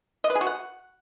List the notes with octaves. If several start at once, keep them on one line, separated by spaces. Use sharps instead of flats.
D#5
B4
G#4
F#4
F#5